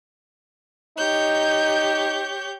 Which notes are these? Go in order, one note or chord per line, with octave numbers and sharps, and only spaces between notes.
D#4 G4 C#5 G6